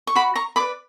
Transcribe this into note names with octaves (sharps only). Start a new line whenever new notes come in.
C#6
F#4 B5 D6
A#5 C#6
B4 D5 B5 D6